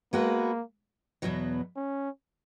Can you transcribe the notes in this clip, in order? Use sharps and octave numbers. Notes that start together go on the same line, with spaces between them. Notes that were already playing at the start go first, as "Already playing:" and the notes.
G#3 A#3 B3 F#4 B4
E2 B2 F#3 B3
C#4